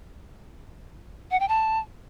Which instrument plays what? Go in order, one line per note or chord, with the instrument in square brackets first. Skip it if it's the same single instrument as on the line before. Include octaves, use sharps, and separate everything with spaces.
[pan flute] F#5
G5
A5